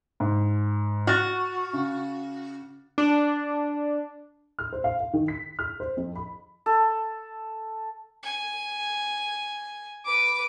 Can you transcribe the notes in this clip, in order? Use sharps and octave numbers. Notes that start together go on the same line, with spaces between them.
G#2
F#4 F6 A6
C#3
D4
F6
C5
F5
F5
D#3
B6
F6
C5
F2
B5
A4
G#5
B4 D6